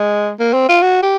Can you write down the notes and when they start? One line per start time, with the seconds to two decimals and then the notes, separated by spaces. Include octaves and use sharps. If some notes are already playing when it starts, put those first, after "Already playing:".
Already playing: G#3
0.40 A#3
0.53 C4
0.69 F4
0.82 F#4
1.03 G4